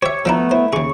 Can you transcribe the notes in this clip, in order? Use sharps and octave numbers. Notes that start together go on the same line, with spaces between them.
G4 C5 C#5 E5
F3 A3 B3 D4 E4 A4 A#5
E4 C5
D#2 C#3 G#4 C#6